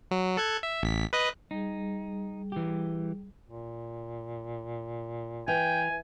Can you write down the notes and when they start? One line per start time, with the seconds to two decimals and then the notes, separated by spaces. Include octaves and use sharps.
0.11 F#3
0.37 A4 F#6 G#6
0.63 E5
0.83 A1 B6
1.13 B4 D#5 F#6
1.51 G3 D#4 G#4
2.52 E3 G4
3.47 A#2
5.48 E3 G5 G#5